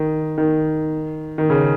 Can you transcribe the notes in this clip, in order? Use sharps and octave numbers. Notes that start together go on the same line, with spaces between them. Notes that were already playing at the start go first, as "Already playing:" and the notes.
Already playing: D#3
D#3
D#3
C#3